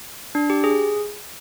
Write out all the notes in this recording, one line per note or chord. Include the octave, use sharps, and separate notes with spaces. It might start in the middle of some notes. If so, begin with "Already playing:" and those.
D4
G4
G#4